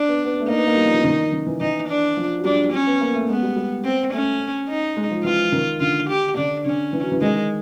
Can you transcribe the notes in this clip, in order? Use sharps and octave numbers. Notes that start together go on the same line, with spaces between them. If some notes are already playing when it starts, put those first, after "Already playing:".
Already playing: D4
B3
B3
A3
A#3 D#4
B3
A#3
G3
F3
E3
D#3
D#3
E3
E3 D#4
D4
F3
F#3
G3 D4
C#4
B3
A#3
A3
G#3 B3
G3
G3
C4
A3 C#4
D#4
G#3
F3
E3 F4
D#3
D3 F4
G4
D3 D4
D3 C#4
E3
F#3
E3
D#3 G#3